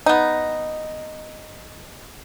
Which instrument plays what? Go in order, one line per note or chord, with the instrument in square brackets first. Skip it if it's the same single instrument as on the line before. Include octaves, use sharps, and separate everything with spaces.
[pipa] B3 D#4